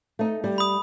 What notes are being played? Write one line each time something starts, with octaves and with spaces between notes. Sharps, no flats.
A3 D#4
G3
B5 D#6